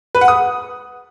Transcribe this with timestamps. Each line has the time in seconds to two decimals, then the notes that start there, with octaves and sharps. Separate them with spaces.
0.15 B4
0.21 F#5
0.28 D#6